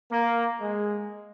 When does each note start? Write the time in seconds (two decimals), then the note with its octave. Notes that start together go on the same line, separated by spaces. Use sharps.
0.12 A#3
0.60 G#3